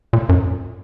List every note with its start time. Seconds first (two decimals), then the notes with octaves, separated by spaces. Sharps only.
0.13 A#2
0.29 F#2